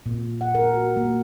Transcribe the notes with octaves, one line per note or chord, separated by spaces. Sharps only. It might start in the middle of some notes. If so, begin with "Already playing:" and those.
A#2
F#5
A#4
F#4
A#3